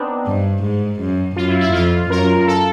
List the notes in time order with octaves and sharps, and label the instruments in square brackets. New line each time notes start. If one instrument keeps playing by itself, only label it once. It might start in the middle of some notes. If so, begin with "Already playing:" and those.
Already playing: [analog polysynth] B3 C4 D4 D#4
[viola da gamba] G2
G#2
F#2
[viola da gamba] F#2 [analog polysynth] F4
[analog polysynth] E4
E4
[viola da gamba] F2 [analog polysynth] F4
[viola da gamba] F#2 [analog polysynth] A#4
[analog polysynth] A4